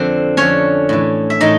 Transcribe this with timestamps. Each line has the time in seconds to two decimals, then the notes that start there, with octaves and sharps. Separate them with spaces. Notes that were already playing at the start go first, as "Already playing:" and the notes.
Already playing: F2 D3 C4 C5
0.37 F2 D3 C#4 C#5
0.89 A2 E3
1.30 E5
1.40 A2 E3 D#4 D#5